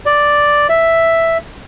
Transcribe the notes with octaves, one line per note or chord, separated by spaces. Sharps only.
D5
E5